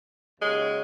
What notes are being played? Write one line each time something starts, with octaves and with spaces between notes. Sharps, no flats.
D#2 C#3 F#3 G#3